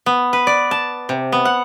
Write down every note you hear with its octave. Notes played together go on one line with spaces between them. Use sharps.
B3
B4
D5
A5
C3
B3
F#5